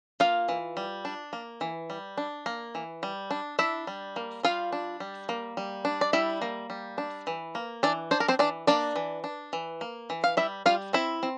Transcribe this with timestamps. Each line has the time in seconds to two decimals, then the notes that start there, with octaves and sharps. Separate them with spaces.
0.20 A#3 F4 F5
0.49 E3
0.77 G3
1.05 D4
1.33 A#3
1.61 E3
1.90 G3
2.18 D4
2.46 A#3
2.75 E3
3.03 G3
3.31 D4
3.59 D4 E4 E5
3.87 G3
4.16 A#3
4.43 G3 F4 F5
4.72 D4
5.00 G3
5.29 A#3
5.57 G3
5.85 D4
6.01 D5
6.13 G3 E4 E5
6.42 A#3
6.70 G3
6.98 D4
7.27 E3
7.55 A#3
7.83 E3 D4 D5
8.11 D4 C5
8.20 A#4
8.28 C4 C5
8.39 E3 D4 D5
8.67 A#3 D4 D5
8.96 E3
9.24 D4
9.53 E3
9.81 A#3
10.10 E3
10.24 F5
10.37 G3 E4 E5
10.66 G3 F4 F5
10.93 C4 E4 E5
11.23 C4